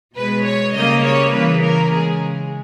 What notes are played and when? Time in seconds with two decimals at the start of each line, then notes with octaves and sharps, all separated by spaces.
0.17 B2 G#3 B4
0.46 C#5
0.75 C#3 G3 A#3 D#5
1.05 C#5
1.34 C#3 E3 A#3 B4
1.63 A#4
1.92 C#3 G#3 G#4